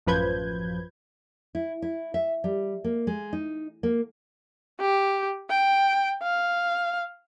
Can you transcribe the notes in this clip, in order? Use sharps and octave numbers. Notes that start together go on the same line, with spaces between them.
A1 F#2 F3 B4 G6 G#6
E4
E4
E5
G3
A#3
G#3
D#4
A#3
G4
G5
F5